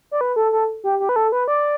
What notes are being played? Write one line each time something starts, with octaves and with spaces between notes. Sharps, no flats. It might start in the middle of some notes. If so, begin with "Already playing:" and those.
D5
B4
A4
A4
G4
G4
B4
A4
B4
D5